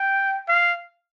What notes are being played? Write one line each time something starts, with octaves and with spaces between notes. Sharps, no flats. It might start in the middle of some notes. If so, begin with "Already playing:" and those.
Already playing: G5
F5